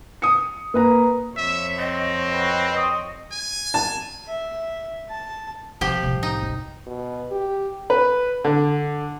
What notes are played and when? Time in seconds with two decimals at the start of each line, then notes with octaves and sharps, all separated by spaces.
0.22 D#6 C#7
0.74 A#3 B4 A#5
1.37 F2 C#5 E5
1.79 C4 D#5
2.32 F#4 B4 G5
2.76 C6 C#6 D#6
3.32 G#5
3.74 A5
4.28 E5
5.10 A5
5.81 C3 F3 G4
6.03 C2 A2
6.23 D#4
6.43 F#2
6.87 B2
7.31 G4
7.90 B4
8.44 D3